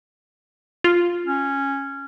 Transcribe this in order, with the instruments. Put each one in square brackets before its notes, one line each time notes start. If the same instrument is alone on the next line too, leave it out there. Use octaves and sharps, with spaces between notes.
[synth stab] F4
[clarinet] C#4